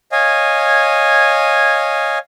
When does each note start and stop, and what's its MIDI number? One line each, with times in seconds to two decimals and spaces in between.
0.12 2.19 73
0.12 2.19 75
0.12 2.19 77
0.12 2.19 80